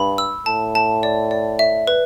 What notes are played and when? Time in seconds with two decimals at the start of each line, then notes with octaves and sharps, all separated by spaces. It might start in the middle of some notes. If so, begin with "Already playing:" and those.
Already playing: G2 B5
0.18 E6
0.46 A2 A5
0.75 A5
1.03 D5
1.31 D5
1.59 E5
1.87 B4